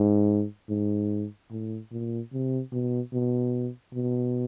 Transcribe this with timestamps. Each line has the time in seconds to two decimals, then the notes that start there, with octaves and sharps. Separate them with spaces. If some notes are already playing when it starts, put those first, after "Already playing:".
Already playing: G#2
0.69 G#2
1.51 A2
1.92 A#2
2.32 C3
2.72 B2
3.13 B2
3.94 B2